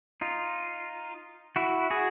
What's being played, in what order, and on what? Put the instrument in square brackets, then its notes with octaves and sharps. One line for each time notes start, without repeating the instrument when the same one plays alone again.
[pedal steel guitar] D#4 F4
E4 F#4
F#4 G#4